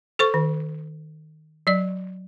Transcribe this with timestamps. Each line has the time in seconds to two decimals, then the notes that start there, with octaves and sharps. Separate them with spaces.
0.19 A4 C5 C#6
0.34 D#3
1.67 F#3 D5